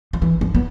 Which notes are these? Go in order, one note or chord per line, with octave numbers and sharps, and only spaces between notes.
F3
E3
F3
B3